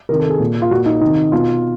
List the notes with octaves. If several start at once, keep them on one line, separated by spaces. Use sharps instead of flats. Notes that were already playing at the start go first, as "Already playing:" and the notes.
C3 D#3 A#4
A4
G#4
A#2
F4
A#2 F#4
D#4
C3 D#3 D#4
B2 F4